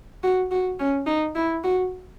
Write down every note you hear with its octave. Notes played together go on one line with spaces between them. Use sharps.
F#4
F#4
C#4
D#4
E4
F#4